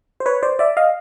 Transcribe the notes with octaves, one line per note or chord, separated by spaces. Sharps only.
C5
B4 C#5
C5 D5
D5 E5
D#5 F5